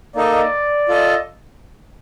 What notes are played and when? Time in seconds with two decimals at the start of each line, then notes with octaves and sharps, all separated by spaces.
0.16 A#3 D#4 A4 D5 D#5
0.88 F4 A4 D#5